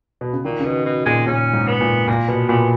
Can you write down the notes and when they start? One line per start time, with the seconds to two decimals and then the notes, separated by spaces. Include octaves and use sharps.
0.21 B2
0.33 C#3
0.45 A#2 D#3
0.60 C#3
0.64 B2 D#3
0.85 B2
1.05 A#2 G#3
1.27 A#2 C#4
1.53 G#2
1.67 B3
1.81 A#2
2.08 A#2 A#3
2.28 B2 B3
2.49 A#2 B3